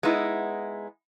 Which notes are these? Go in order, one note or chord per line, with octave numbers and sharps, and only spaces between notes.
G#3 B3 D#4 E4